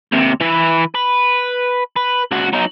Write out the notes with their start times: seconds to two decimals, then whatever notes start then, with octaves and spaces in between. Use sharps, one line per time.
0.12 D#2 C3
0.41 E3 B4
0.95 B4
1.96 B4
2.32 C#2 F#4
2.53 F#3 D#4